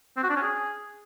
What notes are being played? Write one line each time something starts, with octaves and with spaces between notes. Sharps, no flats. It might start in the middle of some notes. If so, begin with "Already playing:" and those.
C4
F#4
D4
C#4
G#4